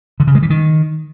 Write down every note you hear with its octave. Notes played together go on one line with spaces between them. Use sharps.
D3
C#3
G#3
E3
D#3